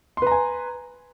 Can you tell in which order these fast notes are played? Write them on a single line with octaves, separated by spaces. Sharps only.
C6 B4 A#5 G#5